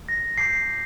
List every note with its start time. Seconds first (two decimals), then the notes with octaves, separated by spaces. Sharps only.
0.09 A#6
0.38 A5 D6 G6 C7